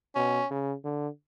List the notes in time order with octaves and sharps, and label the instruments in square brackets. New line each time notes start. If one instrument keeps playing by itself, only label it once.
[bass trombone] B2 [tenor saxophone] C#4
[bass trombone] C#3
D3